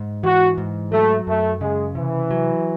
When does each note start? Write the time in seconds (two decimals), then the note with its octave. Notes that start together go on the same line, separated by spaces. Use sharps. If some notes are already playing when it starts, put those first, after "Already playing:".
Already playing: G#2
0.23 E3 F#4
0.58 G#2
0.92 F#3 A3
1.27 F#2 A3
1.61 C#3 G#3
1.95 C3 E3
2.31 F#3